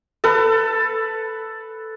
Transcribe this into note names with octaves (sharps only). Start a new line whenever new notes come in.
A4 B4